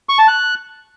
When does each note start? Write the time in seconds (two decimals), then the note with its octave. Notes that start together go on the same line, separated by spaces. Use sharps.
0.09 C#6
0.19 A5
0.28 F#6